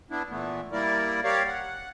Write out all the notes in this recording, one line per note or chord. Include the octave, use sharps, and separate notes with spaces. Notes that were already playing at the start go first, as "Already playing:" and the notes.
B3 D4 E4
A#2 E3 A3 B3
G3 A#3 E4 A#4 D5
G4 A#4 C#5 D5 F5
F#5